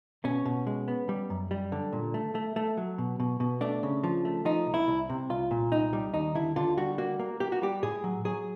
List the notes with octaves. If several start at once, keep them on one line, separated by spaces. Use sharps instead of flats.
B2 C#4
B2
G#3
B3
G3
F#2
G3
D3
A#2
A3
A3
A3
F#3
B2
B2
B2
A3 D4
C#3
F3
A3
F3 D#4
C2
E4
C2
C3
C2 F4
A#2
C2 D#4
G3
D#2 D#4
D3 E4
D3 F4
G3 F#4
A#3 F#4
A#3
A#3 G4
F#4
G3 G4
A2 G#4
F#3
F#3 G#4